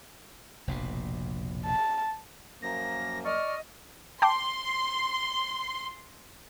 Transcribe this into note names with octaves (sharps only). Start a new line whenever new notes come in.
F1 A#1 B2
A5
F#2 F3 A#3 A#6
D5 D#5 C#6 F6
G5 A5 C6 D6